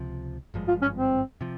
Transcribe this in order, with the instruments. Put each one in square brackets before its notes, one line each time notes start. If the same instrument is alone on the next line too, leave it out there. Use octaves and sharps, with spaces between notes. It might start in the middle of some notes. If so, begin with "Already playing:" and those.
Already playing: [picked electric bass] C#2 C3 F3
G#1 G2 F3 G#3
[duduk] F4
C#4
C4
[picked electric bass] C3 F3